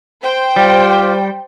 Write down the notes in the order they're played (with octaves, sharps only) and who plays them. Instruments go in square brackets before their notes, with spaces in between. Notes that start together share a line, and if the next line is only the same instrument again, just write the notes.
[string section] C5 G5
[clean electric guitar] G3 [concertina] F4 G4